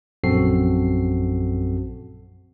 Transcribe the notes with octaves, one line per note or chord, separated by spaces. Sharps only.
A#1 F#2 C4 F#4 A4 C7